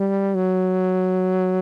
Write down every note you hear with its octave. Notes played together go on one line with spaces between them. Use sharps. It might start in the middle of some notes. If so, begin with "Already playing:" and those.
Already playing: G3
F#3